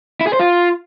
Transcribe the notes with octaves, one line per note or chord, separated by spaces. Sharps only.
E4
G#4
C5
F4